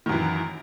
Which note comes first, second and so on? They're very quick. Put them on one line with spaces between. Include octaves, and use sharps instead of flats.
D#3 F#2 E3